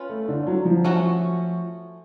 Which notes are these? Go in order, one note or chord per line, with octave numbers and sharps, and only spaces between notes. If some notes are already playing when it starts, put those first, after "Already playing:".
Already playing: C#4 F4 B4
A3
D3
F#3
F3
A3 C#4 F#4